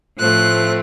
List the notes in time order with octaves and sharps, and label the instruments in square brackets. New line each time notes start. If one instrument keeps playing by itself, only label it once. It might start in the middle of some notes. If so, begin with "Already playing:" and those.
[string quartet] A2 F3 A3 C4 F#6